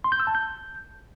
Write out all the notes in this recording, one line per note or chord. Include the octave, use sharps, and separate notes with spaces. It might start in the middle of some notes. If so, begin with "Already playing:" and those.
C6
G6
E6
A5
G6